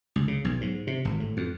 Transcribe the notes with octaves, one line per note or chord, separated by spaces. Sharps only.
C#2
C#3
B1
G#2
C3
G#1
A2
F2